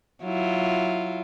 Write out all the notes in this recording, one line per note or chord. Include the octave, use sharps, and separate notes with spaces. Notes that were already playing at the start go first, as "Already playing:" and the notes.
F#3 E4 F4